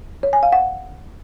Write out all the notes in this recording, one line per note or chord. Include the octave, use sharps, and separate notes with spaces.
C#5
G#5
F5
F#5